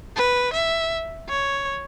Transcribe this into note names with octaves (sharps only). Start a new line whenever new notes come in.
B4
E5
C#5